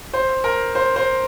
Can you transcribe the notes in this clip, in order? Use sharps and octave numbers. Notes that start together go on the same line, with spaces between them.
C5
A#4
C5
C5